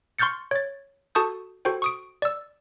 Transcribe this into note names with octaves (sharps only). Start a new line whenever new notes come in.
C6 C#6 F6 G6 A6 C#7
C#5 A6
F#4 A4 A5 C#6 D#6 G6
F#4 A4 C5 G5
C#6 D#6 D7
D5 E6